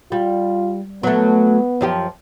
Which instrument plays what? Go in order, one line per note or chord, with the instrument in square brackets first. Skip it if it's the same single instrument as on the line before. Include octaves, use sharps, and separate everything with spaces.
[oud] G3 [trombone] F4
[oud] F#3 A3 [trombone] B3
[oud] F#2 F3 G4